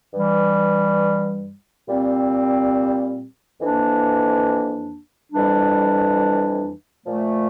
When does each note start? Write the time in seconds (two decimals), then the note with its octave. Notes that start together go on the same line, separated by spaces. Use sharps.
0.13 G2 E3 G3
1.87 A#2 G3 C4
3.60 F2 E3 A#3 D4
5.32 F2 E3 G3 D4
7.05 A#2 F3 A3